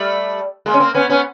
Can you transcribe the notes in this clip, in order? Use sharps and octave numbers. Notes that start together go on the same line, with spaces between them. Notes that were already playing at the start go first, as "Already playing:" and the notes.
Already playing: G3 A3
G#3 A#3
C#4
A#3 C4
B3 C#4
B3 C#4